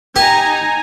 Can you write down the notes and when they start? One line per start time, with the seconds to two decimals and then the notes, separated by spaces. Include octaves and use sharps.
0.16 D#4 G4 G#5 A#5